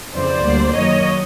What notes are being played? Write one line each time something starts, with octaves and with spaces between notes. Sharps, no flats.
F2 C#3 E3 C5 D5
D2 D3 G3 A#3
F#2 D#3 F#3 A#3 C#5 D#5